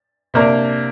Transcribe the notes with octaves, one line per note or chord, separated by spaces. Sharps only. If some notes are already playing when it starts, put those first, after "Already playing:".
C3 A#3 D4 A#4